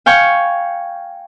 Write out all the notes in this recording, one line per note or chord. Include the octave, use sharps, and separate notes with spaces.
F5 G5 G#5 C#6